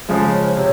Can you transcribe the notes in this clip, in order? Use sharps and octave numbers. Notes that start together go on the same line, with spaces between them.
C#3 F3 G#3 C5
C#5
C#5
C5
C3 C#5